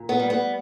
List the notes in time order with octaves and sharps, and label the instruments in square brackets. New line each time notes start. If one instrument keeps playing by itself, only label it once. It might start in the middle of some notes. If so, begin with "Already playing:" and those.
Already playing: [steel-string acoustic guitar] A#2
B3
G3
B3